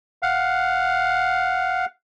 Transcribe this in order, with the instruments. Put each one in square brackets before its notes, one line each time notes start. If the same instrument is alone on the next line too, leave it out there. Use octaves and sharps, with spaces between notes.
[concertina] F5 F#5